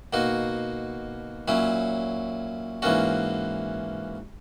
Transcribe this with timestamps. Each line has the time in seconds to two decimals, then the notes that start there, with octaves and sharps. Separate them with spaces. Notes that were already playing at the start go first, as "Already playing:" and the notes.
0.13 B2 A#3 D#4 F#4
1.48 A#2 F#3 C#4 E4
2.82 G#2 E3 A#3 C#4 F#4